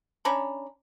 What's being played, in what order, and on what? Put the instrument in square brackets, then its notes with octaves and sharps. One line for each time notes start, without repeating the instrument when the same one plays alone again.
[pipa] C#4 D4 A#5 B5